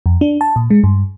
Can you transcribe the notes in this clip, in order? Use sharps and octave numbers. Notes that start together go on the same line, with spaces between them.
F2
D4
A5
A#2
G#3
G2